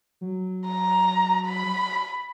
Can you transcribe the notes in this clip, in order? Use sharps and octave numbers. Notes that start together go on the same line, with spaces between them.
F#3
A#5
B5